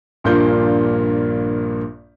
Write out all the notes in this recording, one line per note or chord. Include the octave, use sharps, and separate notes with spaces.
A#1 G2 A#2 A#3 F4 G6